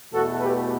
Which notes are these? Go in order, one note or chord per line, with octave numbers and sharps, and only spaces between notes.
E2 B2 A3 F#4 A4
G4 B4